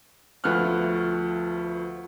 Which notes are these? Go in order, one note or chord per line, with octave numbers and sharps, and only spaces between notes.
D2 F3 A3 B3 F6 F#6